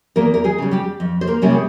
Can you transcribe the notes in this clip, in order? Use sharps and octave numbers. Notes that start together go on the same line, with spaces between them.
E2 A#3 A#4
A#4
G#3 G#4
C#3 G3
G3 G4
F2
C5
A#3 A#4
C3 G3 A#3 C#4
G#4